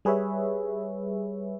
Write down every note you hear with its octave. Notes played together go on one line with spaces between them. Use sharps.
G3 G#4 B4 C#5 E5